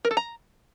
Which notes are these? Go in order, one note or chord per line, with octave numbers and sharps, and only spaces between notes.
A#4
A4
A#5